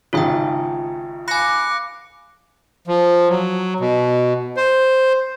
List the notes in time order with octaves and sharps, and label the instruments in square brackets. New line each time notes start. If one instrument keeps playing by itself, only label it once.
[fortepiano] G#1 C#3 D#4 [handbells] F4 E5 G5
[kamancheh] F5 D6 [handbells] G#5 B5 [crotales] F#6 A#6 C#7
[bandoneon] F3
F#3
B2
C5